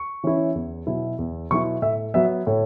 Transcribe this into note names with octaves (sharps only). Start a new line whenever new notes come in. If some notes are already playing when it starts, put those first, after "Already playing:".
Already playing: C#6
E3 C#4 E4
E2
B2 F#3 B3 E4
E2
B2 F#3 B3 E4 C#6
A2 E5
F#3 B3 E5
A2 C#5